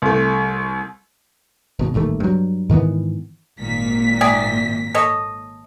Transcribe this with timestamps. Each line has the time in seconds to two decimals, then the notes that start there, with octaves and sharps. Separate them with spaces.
0.02 C2 A3
1.79 G#1 B2
1.94 D#1 A1 D#2 A3
2.20 G2 F#3
2.70 G#2 D#3 E3 B3
3.59 G#1 A#2 B6
4.21 C3 G#4 D5
4.95 A4 C#5 D#5